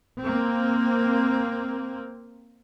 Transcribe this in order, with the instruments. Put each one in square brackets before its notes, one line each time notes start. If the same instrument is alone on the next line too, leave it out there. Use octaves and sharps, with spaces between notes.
[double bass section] A#3 C4